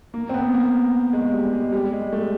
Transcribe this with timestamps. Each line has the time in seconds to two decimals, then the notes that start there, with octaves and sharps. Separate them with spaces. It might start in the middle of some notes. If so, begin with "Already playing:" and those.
0.14 A#3
0.29 C4
0.34 B3
0.54 A#3
1.13 G#3
1.33 G3
1.53 G#3
1.73 G3
1.92 G#3
2.13 A3